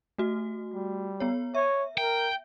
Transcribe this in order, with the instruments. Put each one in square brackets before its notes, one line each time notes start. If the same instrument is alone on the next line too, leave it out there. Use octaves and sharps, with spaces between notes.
[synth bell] A3 F#4
[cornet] G3
[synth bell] B3 C#5
[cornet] C#5 [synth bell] E5
[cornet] A#4 [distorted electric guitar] G5